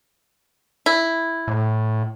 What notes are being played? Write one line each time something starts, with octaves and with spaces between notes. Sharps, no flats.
E4
A2